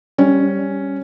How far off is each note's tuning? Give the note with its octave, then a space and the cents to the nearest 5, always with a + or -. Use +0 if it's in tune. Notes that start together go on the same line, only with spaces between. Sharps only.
G3 +0 C#4 +0